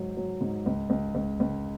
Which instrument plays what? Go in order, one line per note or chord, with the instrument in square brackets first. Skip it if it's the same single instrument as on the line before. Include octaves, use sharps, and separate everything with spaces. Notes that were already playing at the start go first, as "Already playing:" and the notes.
Already playing: [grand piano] G#2 F#3
F#3
G#2
C#2
C#2
C#2
C#2